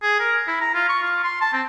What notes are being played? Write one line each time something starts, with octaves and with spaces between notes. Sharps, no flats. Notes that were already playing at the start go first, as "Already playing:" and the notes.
G#4
A#4
E4
A#5
F4
C#6
F4
C6
A5
C4